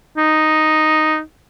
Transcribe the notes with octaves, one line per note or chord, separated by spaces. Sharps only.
D#4